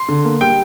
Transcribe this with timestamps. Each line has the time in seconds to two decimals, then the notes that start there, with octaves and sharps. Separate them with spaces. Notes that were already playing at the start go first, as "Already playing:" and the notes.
Already playing: C6
0.09 D3
0.25 A#3
0.41 G3 G5